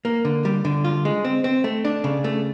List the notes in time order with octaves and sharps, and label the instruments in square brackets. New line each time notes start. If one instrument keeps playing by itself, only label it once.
[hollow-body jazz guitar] A#3
D3
G3
D3
F4
G#3
C4
C4
A3
D4
C#3
A3